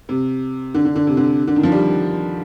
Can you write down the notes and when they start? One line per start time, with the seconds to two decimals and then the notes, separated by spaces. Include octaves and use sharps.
0.09 C3
0.74 D3
0.85 D3
0.96 D3
1.07 C3
1.17 D3
1.47 D3
1.56 D#3
1.63 F3
1.72 G3